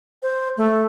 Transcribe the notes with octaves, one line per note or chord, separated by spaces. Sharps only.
C5
A3